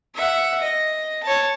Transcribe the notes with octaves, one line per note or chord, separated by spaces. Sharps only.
E5 F#5
D#5
C#5 A5